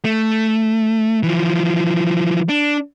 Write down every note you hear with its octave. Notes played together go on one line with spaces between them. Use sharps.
A3
E3 F3
D4